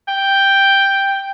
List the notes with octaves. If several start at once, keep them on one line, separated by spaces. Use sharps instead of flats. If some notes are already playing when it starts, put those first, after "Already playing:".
G5